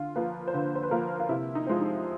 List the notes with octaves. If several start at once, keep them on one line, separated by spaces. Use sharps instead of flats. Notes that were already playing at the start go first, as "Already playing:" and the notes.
Already playing: D3 F4
F3 A#3 B4
C5
D3 B4
C5
B4
F3 A#3 A#4
F4
C3 E4
D#4
F3 G#3 C4
D#4